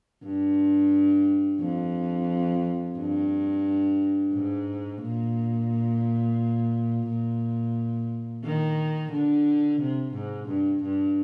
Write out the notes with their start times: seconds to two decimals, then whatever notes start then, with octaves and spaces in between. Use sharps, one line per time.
0.24 G2
1.60 F2
2.97 G2
4.33 G#2
5.02 A#2
7.07 A#2
8.44 D#3
9.11 D3
9.81 C3
10.14 G#2
10.48 G2
10.83 G2